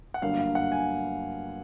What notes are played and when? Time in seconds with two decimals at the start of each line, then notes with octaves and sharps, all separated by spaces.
0.14 F#5
0.22 G1 G2 D3 F#3 A#3 F5
0.39 F5
0.55 F#5
0.72 G#5